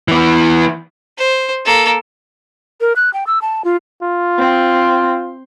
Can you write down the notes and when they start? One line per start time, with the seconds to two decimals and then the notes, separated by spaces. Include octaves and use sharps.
0.08 E3 B3
1.18 C5
1.65 A#3 A4
2.81 A#4
2.96 F#6
3.14 G5
3.27 E6
3.42 A5
3.65 F4
4.02 F4
4.38 C4